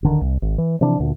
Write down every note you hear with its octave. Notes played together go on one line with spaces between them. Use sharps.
D1 D3 D#3
C2
G#1
E3
C3 E3 F3 D4
D2 A#2 D3